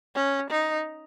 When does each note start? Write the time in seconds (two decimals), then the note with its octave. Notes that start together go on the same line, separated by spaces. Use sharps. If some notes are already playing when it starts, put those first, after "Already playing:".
0.15 C#4
0.50 D#4